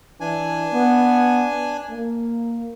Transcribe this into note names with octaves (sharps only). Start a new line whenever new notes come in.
E3 D4 G#5
B3
A#3